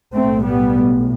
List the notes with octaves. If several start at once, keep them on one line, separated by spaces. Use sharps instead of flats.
B1 A2 A3 C4
G3 B3